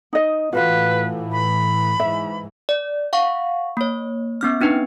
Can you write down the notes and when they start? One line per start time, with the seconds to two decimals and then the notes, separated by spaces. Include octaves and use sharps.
0.13 D#4 D#5
0.53 A2 E3 F4 F#4 B4 F5
1.31 B5
2.00 G#2 E3 E5
2.69 D5
3.13 F5 F#5 C#6
3.77 A#3 C#5
4.41 B3 C#4 F6
4.61 C4 D4 D#4 B4